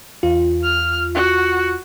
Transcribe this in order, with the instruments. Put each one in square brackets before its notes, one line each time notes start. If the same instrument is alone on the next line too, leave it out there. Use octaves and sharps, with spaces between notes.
[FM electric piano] E2 F4
[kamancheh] F6
F#4